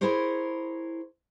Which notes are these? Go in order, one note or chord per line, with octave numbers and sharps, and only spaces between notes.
E4 G#4 A#4 C5 C#5